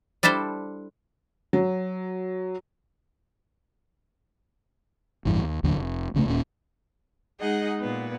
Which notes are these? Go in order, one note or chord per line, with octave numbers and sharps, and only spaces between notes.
G3 D4 E4 A4 C5
F#3
A1 E2 G2 E3
D#2
A1 D#2 D3 F#3
F1
B1 C#3 F#3 A3
D#1 A#2 C#4
G#3 D#4 G#4 D#5 F#5
A#2 B3